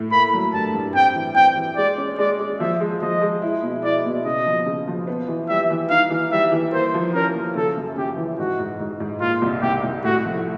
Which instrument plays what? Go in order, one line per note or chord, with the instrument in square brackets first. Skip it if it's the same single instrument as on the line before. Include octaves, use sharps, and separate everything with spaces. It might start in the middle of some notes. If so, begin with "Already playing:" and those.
Already playing: [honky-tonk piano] A2
[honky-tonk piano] A#3 [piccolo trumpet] B5
[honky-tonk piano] F#3
[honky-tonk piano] G2 [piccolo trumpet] A5
[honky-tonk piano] G2
[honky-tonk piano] C4 [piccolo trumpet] G5
[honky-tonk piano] E3
[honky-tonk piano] C4 [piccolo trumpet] G5
[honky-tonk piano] E3
[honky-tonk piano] G#3 [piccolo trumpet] D5
[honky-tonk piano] C#4
[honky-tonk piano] G#3 [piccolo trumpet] D5
[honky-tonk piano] G#3
[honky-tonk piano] F3 [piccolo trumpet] E5
[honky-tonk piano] G#3
[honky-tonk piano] F3 [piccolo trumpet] D#5
[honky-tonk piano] G#3
E4
B2
[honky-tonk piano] E4 [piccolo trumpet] D5
[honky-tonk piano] B2
[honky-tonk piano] C#3 [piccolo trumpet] D#5
[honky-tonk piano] F3
C#3
F3
B3
E3
[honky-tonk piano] G3 [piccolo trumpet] E5
[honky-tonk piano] E3
[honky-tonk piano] D#4 [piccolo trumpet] F5
[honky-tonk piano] E3
[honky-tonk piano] G3 [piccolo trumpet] E5
[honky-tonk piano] E3
[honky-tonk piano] A#3 [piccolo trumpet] C5
[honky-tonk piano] F3
[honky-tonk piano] C#4 [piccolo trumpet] A#4
[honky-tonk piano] F3
[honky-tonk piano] C#3 [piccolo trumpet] A4
[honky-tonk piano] F#2
[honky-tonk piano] C#3 [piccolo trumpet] G4
[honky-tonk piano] E3
[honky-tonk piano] G#2 [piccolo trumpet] F#4
[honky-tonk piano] G#2
G#2
G#2
[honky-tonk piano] A#2 [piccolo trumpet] F4
[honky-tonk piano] C2
[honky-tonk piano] C2 [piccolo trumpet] G4
[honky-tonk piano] C2
[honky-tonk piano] A2 [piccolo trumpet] F#4
[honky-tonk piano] F3